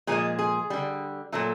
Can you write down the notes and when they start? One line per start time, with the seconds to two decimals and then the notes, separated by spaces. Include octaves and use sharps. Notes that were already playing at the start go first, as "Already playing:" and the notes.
0.07 A#2 F3 G#3 G#4
0.39 G#4
0.70 D3 G3
1.32 A#2 F#3 A3 A4